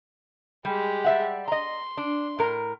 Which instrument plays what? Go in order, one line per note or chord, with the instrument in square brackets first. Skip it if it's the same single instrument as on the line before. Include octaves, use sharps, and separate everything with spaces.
[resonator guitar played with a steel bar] G3 [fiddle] G#3 G4
[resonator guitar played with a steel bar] G3 E5 F#5
[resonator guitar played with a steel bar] D#5 A#5 [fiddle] C6
[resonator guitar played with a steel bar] D4
A2 A#4 A#5